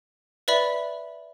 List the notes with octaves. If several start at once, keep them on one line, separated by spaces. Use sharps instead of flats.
B4 D5 E5 B5